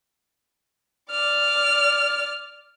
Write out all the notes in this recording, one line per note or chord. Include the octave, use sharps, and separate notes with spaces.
D5 F6